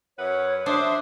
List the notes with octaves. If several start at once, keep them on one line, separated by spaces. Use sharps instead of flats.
F#2 B4 C#5 F#5
D4 C5 E5 D#6